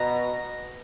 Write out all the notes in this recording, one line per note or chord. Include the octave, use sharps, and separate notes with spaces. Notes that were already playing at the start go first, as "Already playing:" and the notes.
Already playing: B2 A#5